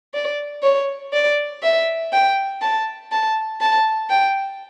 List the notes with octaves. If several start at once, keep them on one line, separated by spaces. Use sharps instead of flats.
D5
C#5
D5
E5
G5
A5
A5
A5
G5